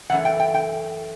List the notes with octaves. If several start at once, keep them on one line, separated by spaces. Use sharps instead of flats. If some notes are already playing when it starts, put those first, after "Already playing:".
F#2 E3 A3 F#5
G5
G5
G5